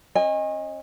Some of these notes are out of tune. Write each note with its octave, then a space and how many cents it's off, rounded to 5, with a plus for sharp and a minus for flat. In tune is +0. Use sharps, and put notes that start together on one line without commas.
C#4 -40 D#5 +0 G#5 -30